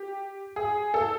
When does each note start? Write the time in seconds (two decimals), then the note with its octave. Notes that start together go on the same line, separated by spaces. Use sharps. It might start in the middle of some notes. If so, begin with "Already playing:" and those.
Already playing: G4
0.56 G#4
0.94 A4